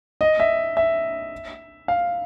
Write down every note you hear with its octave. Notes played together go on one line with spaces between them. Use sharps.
D#5
E5
E5
F5